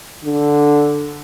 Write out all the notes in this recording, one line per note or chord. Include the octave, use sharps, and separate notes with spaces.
D3